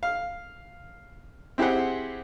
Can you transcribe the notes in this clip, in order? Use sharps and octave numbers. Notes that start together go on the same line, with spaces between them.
F5
C4 E4 G4 G#4 C5 F#5